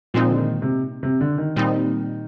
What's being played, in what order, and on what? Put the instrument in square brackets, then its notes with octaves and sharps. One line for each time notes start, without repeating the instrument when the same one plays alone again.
[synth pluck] A#2 G#3 C4 D#4 [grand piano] F3
[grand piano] D3
D#3
C3
C3
D3
D#3
[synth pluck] A#2 G3 C4 D#4